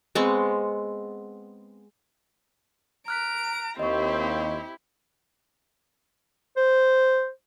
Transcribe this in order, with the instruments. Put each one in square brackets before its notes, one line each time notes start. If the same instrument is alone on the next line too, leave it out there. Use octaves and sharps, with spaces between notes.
[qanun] G#3 B3 C4 C#6
[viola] A#5 [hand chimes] F6 F#6 B6 [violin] D7
[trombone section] D#2 [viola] C4 [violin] E4 G4 [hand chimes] D#5 C#6
[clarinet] C5